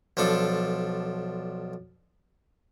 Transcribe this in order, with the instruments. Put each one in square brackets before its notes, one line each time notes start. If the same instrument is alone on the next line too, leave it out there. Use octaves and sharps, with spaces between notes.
[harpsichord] B1 F3 D4 A4